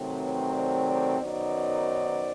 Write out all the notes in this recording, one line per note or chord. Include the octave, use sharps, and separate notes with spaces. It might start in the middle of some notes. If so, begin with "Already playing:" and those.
Already playing: C3 D#3 F#3 A3 C4
B4 C#5
C5 D5
C5 D5
F#2 D#3 F#3 B3 D#4 C5 D5